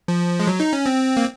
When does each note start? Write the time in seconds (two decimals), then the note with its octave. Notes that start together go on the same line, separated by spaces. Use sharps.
0.08 F3
0.40 G#3
0.47 F#3
0.60 D#4
0.73 C#4
0.86 C4
1.17 A#3